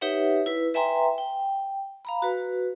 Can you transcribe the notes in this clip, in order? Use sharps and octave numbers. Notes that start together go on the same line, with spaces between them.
D#4 G4 B4 C#5 E5 F#5
E4 B4
B4 E5 G5 G#5 A#5 C6
G5
F5 A#5 B5
F#4 B4